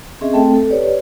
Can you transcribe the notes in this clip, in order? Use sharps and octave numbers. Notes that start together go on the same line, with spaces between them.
C4 C#4 G#4 D#5 E5
A3 C4 A4 G5 A5
A4
G4 B4 C#5 D5